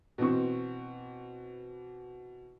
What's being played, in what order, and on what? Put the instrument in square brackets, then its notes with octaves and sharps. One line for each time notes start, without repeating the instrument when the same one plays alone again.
[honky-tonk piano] B2 E3 C4 C#6